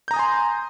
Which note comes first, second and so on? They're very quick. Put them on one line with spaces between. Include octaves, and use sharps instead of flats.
G6 A#5 D#6 G#5 C6